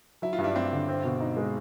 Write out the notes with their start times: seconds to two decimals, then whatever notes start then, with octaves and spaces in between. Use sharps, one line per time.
0.22 F#3 E4
0.33 F4
0.38 G2
0.44 D4 E4
0.55 G2 C4 D4
0.72 D3
0.89 C4
1.04 B2
1.20 D#4
1.37 G#3